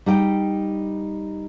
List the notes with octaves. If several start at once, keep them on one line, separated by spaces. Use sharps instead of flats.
G3 D#4 G5